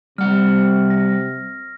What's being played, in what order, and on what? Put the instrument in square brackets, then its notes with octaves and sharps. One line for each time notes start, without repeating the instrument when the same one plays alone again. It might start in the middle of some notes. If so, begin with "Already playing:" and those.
[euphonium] C3 [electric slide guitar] G3 F#5 [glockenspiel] F6
[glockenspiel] A#6